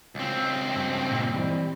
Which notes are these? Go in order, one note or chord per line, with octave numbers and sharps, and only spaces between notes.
C#2 C4
G2
A#2
E3 G3 C4